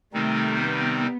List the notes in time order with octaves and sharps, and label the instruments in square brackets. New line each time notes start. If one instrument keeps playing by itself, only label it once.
[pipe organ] C3 D#3 G3 C4 D#4 [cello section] A3
[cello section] B3